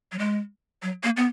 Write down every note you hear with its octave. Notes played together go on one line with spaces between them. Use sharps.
F#3
G#3
F#3
A#3
B3